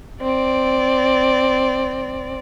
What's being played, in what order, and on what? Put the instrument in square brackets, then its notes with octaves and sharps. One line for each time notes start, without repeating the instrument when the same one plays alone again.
[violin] C4 D5